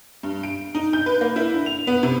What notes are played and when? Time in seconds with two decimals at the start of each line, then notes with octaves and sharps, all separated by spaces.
0.23 G2
0.43 D7
0.75 D#4
0.93 G6
1.06 B4
1.21 A#3
1.36 E4
1.54 D3
1.66 F7
1.87 B3
2.03 C3